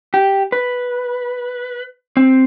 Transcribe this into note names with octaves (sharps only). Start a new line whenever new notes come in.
G4
B4
C4